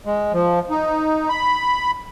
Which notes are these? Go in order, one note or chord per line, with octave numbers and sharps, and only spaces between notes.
G#3
F3
D#4
B5